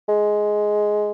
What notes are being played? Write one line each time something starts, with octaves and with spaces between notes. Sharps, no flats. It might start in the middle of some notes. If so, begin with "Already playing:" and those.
G#3